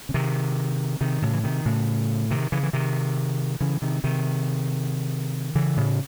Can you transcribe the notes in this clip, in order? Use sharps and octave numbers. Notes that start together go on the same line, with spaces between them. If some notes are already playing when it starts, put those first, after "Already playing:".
C#3
C3 D#3
C3 D#3
A2 C#3
E3
C3 D#3
A2 C#3
C3 D#3
C#3 E3
E3
C3 D#3
C#3 E3
C3 D#3
C3 D#3
C#3 E3
A2 C#3